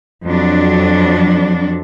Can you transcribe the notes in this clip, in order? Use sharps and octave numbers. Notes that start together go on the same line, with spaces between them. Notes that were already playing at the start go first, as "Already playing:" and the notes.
F2 F#3 D4